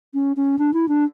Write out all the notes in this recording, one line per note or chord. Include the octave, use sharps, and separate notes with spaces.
C#4
C#4
D4
E4
D4